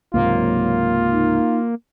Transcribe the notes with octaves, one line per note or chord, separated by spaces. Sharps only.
C#2 G#2 C3 F#3 A#3 F4
D#4